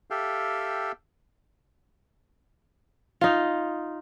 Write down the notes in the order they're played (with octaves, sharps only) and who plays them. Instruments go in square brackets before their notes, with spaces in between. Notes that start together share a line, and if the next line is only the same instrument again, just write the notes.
[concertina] G4 A4 E5 F5 G5
[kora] D#4 F4